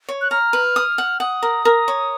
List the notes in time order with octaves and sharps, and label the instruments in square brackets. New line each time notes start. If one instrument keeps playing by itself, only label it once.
[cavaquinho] C#5
[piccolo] F#6
[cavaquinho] A#5 [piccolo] F6
[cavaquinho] B4
D#6
F#5
[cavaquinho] F#5 [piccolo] D#6
[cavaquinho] A#4
A#4
C#5